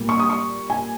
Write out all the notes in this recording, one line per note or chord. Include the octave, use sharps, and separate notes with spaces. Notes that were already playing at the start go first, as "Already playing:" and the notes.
Already playing: A#2 G3 A#3
C#6
D#6
C#6
G#5